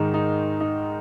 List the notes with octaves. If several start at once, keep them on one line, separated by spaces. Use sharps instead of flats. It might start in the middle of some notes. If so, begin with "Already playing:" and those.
Already playing: G#2 D#3 G#3 D#4
D#4
D#4